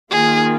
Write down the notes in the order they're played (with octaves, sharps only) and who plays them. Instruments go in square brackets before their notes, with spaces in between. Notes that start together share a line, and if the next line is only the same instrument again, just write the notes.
[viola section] D#3 A#3 F4 [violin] G#4